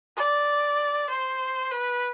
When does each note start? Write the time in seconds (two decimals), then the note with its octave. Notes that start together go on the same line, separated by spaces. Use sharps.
0.17 D5
1.09 C5
1.71 B4